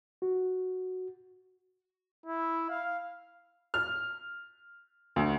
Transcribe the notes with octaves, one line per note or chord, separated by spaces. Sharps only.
F#4
E4
F5
F6
D2